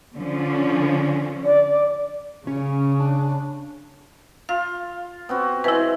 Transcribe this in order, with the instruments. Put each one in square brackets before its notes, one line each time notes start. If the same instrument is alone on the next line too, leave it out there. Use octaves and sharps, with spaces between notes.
[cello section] D3 F3 C#4
[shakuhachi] D5
[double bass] C#3 [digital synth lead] C#4
[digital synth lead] D4
[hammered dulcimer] F4 [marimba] F5
[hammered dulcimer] B3 C4 F#4
[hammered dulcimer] E3 G#3 C5 [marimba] E4 B4